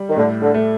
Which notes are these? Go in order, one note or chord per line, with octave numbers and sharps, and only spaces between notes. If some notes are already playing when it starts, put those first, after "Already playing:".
Already playing: G3
D#3
A2 D3
D3
A3